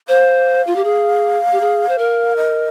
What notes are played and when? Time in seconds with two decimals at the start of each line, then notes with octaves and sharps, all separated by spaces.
0.08 C5 F5
0.67 F4
0.76 G4
0.84 G#4
1.52 G4
1.61 G#4
1.89 C5
1.98 A#4
2.37 D#5